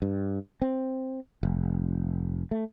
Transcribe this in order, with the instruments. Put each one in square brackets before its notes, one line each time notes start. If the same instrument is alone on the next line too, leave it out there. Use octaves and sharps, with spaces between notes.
[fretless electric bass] G2
C4
F1
A3